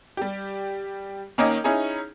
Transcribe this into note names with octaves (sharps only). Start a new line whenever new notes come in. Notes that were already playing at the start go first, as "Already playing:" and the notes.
G3 G4
D#3 A#3 C#4 A#4 D#5
C#4 D#4 E4 G#4